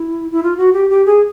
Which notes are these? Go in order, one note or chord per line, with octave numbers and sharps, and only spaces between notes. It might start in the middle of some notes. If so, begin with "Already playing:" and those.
Already playing: E4
E4
F4
F#4
G4
G4
G#4